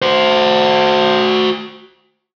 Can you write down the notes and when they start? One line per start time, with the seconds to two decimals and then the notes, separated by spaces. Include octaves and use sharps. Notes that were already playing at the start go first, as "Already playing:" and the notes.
0.02 F#4 C5